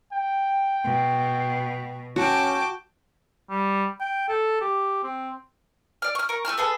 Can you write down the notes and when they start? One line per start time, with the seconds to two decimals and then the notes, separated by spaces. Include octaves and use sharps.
0.13 G5
0.84 B2
2.16 C#4 F#4 G5 A5 D6
3.50 G3
4.00 G5
4.29 A4
4.61 G4
5.03 C4
6.02 D5 F6
6.15 C#6 F6
6.29 A#4 C#6
6.45 A3 F#4 E6 F6
6.58 B3 G#4 A4 B4